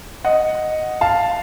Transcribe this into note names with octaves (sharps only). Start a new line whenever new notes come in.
D#5 F#5
F5 A5